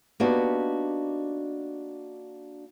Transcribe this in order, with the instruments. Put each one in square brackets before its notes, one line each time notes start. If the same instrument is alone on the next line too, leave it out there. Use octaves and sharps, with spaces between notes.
[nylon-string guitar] A#3 B3 D4 D#4 F#4 G4